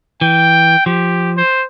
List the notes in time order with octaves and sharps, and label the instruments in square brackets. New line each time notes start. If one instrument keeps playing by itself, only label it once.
[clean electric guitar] E3 [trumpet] G5
[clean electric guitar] F3 [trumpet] G4
[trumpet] C5